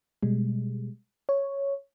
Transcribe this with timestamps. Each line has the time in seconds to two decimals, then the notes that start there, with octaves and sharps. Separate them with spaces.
0.23 B2 G3 G#3
1.29 C#5